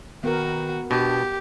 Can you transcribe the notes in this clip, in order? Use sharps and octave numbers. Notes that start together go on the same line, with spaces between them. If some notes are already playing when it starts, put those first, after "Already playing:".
D#3 B3 F#4 A#4
B2 D4 G4